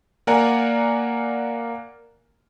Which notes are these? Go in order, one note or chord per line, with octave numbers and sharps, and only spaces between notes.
A#3 A#4 D5 F#5 G#5 A#5